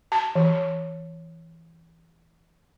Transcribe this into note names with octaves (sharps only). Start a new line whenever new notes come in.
A5
E3